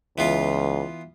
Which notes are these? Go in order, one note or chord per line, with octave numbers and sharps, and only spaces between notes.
C#2 E3 B3 F4